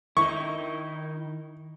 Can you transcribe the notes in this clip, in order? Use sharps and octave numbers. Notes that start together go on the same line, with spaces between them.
D#3 D#4 E4 C#6